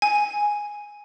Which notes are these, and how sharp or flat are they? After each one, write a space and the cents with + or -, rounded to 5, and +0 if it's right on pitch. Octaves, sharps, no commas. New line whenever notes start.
G#5 +0